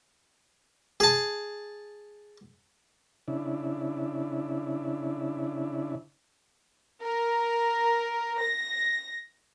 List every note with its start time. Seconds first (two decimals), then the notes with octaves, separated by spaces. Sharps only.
1.00 G#4 A5
3.28 C#3 D4 E4
7.01 A#4
8.39 A#6